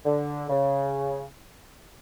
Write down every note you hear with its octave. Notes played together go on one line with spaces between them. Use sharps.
D3
C#3